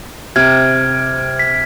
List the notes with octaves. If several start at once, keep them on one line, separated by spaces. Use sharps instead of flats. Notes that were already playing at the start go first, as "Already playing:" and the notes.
C3 F6 G#6
B6